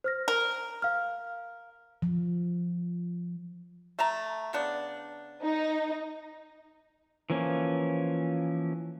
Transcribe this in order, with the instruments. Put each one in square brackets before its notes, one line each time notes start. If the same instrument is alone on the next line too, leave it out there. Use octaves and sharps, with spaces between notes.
[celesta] C5 F6 A#6
[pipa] A#4
[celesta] F5 F6
[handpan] F3
[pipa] A3 A5 A#5
C#3 B3 D4
[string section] D#4
[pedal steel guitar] E3 F3 A#3 C#4